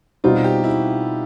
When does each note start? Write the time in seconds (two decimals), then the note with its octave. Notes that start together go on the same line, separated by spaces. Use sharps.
0.24 B2 G3 C4 D#4 F4 F#4
0.44 G4
0.64 E4